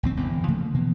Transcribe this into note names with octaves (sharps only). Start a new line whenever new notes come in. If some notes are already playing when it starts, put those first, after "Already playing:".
A#1 D#2 C4
G1 E2 C3
C#3 F3 A3 A#3
B2 E3 A#3 B3